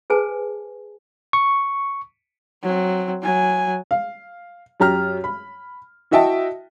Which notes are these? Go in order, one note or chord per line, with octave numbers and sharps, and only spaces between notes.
G#4 B4 C5 G#5 A5
C#6
F#3 C4
F#3 G#5
F5
F#2 G4 A#5 F6
B5
E4 F#4 D#5 E5 G5 A5